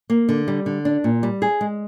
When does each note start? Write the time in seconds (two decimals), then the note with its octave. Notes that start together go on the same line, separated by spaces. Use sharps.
0.10 A#3
0.29 D3
0.48 G3
0.66 D3
0.85 D4
1.04 A#2
1.23 G3
1.42 G#4
1.61 G#3